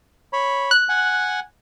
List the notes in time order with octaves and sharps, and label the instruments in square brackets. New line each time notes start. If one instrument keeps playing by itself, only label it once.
[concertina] C#5 B5
[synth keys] F#6
[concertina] F#5 G#5